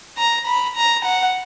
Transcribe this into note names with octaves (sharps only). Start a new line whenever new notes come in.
A#5
B5
A#5
F#5